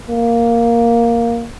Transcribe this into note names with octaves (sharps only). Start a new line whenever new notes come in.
A#3